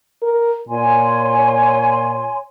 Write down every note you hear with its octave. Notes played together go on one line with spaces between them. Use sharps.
A#4
A#2 C#5 G#5 C6